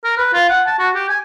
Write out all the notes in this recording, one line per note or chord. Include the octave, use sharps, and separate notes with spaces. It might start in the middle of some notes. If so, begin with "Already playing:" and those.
A#4
B4
F4
F#5
A5
F#4
G4
G#5